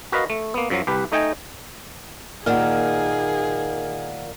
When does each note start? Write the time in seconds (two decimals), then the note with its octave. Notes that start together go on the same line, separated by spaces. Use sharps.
0.12 F#4 A#4 B4 D#5 F5
0.30 A3
0.54 A#3 B3
0.70 F#2 F3 F#3
0.87 C2 G4 B4
1.12 A3 D#4 D#5 G5 G#5
2.46 A#2 D#3 A#3 G#4 F#5 F6